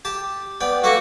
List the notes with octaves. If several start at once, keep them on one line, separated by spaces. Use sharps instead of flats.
G4 A5
B3 D5 G5
A3 A#3 F#4 B4